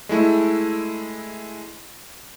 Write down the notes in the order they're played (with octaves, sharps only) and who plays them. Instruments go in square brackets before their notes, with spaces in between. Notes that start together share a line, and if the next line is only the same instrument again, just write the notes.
[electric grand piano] G#3 A3 E4